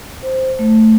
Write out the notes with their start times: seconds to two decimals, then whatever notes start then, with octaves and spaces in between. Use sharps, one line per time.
0.23 C5
0.59 A3